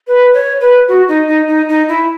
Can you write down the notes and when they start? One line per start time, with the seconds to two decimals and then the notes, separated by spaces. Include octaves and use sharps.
0.07 B4
0.34 C#5
0.61 B4
0.88 F#4
1.08 D#4
1.28 D#4
1.48 D#4
1.69 D#4
1.89 E4